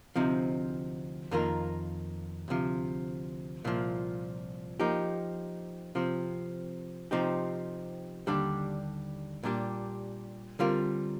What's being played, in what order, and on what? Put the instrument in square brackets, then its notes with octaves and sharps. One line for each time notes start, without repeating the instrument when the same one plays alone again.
[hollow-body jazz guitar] D2 C3 F3 C4 D#4
F2 D#3 A#3 F4 A#4
D2 C3 F3
C2 A#2 F3
F3 A#3 D#4 G4
C3 F3 C4
C3 F3 C4 D#4 G4
D#2 D3 G3 D4 G4
A#2 G3 D4 G4
D3 G3 C4 F4 A#4